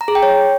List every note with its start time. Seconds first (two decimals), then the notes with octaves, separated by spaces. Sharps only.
0.01 A#5
0.08 G#4
0.15 G5
0.23 C#5